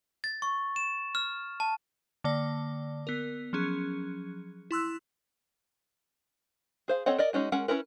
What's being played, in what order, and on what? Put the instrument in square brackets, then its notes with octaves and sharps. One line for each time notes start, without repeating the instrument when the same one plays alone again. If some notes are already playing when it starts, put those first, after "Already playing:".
[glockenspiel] A6
C#6
E7
F6
A5
[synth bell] D3 A#3 D5
B3 A#4
F3 F#3 C#4 G#4
E4 C6 E6 F#6
[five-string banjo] G#4 C5 F5
C4 A4 C#5 D#5 F#5
A#4 D5 D#5
G#3 C#4 D#4 F#4
G#3 C#4 A#4 F#5
C#4 E4 A#4 B4